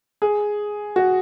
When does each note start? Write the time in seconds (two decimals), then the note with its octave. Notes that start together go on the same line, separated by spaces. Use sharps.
0.22 G#4
0.96 F#4